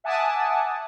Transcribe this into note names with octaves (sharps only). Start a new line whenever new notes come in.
E5 F#5 G#5 A5 D6 D#6